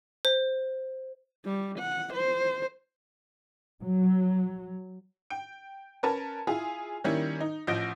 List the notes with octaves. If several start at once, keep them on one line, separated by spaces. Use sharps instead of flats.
C5
G3
F#5
C5
F#3
G5
C#4 A#4 B4 A5
E4 F4 G#4
D#3 G3 A#3 C#4 E4
D#4
A1 F3 D#5 G6 A#6 D7